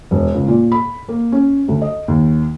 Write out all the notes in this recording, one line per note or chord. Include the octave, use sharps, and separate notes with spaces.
E1
C#2
A#2
B5
A#3
C#4
D2
D#5
D#2